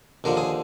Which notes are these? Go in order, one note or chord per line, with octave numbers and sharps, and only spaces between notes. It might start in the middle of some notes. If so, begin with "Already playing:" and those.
D#2 D3 F3 A#4
G#4